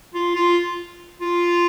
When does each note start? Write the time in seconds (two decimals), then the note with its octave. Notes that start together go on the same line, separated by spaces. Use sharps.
0.14 F4
0.36 F4
1.20 F4